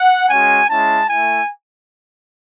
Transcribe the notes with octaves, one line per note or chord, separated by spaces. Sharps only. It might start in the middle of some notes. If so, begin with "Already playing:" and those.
Already playing: F#5
G#3 C#4 F#4 G#5
G#3 C#4 E4 A5
A3 E4 G#5